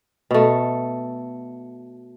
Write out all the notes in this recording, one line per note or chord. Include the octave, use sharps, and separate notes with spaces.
B2 A3